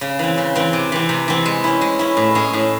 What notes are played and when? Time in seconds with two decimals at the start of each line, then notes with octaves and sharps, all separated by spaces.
0.01 C#3
0.19 E3 C4
0.38 C#3
0.55 E3 C4
0.73 C3
0.92 E3 C4
1.09 C3
1.28 E3 C4
1.45 G#3
1.64 C#4 E4
1.81 G#3
1.99 C#4 E4
2.17 A2
2.35 G#3 C#4 G#4
2.53 A2